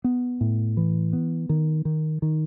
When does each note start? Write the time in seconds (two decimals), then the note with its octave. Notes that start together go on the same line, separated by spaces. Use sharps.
0.04 B3
0.41 A2
0.77 E3
1.13 B3
1.49 D#3
1.85 D#3
2.22 D#3